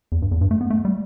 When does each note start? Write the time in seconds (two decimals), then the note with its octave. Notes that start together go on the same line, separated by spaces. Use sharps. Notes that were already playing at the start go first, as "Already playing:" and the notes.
0.12 E2
0.22 G2
0.31 E2
0.41 G2
0.51 A3
0.61 B3
0.70 A3
0.85 G3